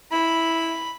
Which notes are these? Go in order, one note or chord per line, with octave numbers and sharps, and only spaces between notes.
E4 B5